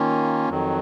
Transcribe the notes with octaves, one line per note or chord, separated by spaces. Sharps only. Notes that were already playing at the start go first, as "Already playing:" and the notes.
Already playing: D#3 A#3 C#4 F4
F2 D#3 F#3